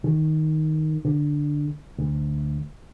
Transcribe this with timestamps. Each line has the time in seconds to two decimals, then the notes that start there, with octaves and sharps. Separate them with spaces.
0.04 D#3
1.05 D3
1.99 D2